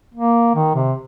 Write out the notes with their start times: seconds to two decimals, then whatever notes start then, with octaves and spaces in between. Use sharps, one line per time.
0.15 A#3
0.55 D#3
0.75 C3